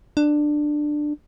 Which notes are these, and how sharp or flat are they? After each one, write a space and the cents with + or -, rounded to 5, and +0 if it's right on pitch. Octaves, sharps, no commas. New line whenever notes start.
D4 +15